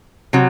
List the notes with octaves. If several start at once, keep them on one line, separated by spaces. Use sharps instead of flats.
C3 F#3